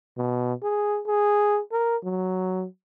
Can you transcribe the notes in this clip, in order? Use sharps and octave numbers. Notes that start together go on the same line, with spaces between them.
B2
G#4
G#4
A#4
F#3